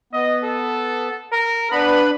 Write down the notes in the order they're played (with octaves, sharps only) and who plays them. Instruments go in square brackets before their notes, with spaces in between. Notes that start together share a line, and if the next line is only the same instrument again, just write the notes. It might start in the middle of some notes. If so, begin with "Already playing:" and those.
[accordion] B3 [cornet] D#5
[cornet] A4
A#4
[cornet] B3 [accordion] D4 B4 B5